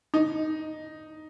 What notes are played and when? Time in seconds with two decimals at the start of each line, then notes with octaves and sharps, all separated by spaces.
0.14 D#4